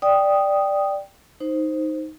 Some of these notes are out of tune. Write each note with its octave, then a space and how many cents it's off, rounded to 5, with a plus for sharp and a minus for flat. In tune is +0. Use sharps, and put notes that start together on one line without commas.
D5 +0 G5 +0 D#6 +0
D#4 +5 C5 +0